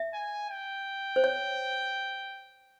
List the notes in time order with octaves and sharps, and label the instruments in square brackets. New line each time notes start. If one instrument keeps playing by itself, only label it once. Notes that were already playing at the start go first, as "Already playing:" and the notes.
Already playing: [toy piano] E5
[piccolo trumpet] G#5
G5
[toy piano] C5
C#5